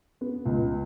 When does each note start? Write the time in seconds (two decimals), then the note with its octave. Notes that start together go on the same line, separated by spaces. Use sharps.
0.21 B3
0.45 C#2